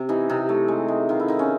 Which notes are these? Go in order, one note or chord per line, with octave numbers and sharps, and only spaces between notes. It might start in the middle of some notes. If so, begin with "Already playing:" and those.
Already playing: C3
E3 D#4
C3 D#4
A3
G#3
G#3
D#3 F4
E4
D#3 D#4
C#4